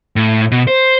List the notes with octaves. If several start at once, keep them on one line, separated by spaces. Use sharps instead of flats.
A2
B2
C5